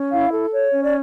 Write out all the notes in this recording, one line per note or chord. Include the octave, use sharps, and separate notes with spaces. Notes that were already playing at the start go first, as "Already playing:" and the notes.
Already playing: C#4
E4 F5
A4
C#5
C#4
D5